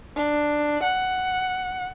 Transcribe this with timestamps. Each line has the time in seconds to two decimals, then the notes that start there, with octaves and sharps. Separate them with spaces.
0.17 D4
0.83 F#5